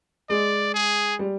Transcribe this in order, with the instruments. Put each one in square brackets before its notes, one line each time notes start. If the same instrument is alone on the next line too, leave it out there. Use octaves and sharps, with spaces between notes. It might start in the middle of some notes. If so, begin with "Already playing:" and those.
[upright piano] G#3 [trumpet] D5
[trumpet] G#4
[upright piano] G3